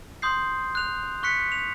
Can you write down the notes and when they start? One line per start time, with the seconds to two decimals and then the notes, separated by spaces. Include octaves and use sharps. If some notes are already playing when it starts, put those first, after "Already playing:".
0.22 C6 D#6 G6 C7
0.75 F#6 F7
1.23 C#6 F#6 B6 C#7
1.52 F7